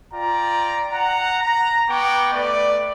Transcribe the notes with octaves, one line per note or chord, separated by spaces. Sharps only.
F4 D5 G5 A#5
F#5 A#5
A#5
B3 G5 C#6 D6
A3 B4 D5